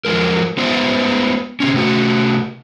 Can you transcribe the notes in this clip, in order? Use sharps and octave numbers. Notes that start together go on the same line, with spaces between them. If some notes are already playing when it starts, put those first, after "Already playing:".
F3 F#3 G#3 A#4
G#3 B3 C5 D5 E5
C3 C4 C#4
C3 A3 F#4